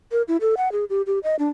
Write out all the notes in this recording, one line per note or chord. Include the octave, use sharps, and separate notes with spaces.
A#4
E4
A4
F#5
G#4
G4
G4
D#5
D4